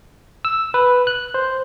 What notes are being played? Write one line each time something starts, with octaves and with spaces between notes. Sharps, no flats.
E6
B4
F#6
C5